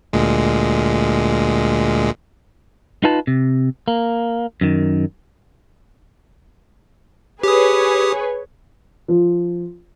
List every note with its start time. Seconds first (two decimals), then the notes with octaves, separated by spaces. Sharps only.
0.13 D2 A#2 G#3
3.04 D#4 F4 B4 A5
3.27 C3
3.88 A#3
4.61 F#2 D#3
7.43 G4 G#4 B4 C#5 D#6
9.08 F3